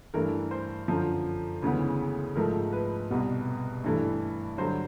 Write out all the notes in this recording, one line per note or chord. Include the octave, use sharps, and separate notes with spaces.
G2 E3 A3 A#4
C5
F#2 D3 F3
D2 C#3 E3 G#3 B3
G#2 F3 A3 A#4
B4
C2 B2 G3 B3
G2 E3 A3
G2 D3 F#3 C5